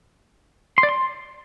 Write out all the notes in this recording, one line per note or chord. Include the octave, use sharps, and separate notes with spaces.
C6
D5
C6